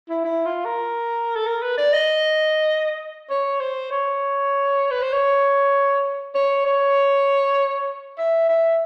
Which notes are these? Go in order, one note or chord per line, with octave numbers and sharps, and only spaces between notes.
E4
E4
F4
A#4
A4
A#4
B4
D5
D#5
C#5
C5
C#5
B4
C5
C#5
C#5
C#5
E5
E5